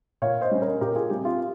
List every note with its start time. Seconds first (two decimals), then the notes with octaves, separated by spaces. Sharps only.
0.22 A#2 C#5 F5
0.41 C5 D#5
0.51 G3 C#4
0.61 A#4 C#5
0.81 A#2 G4 A#4
0.95 F4 G#4
1.10 G3 C4 G4
1.25 F4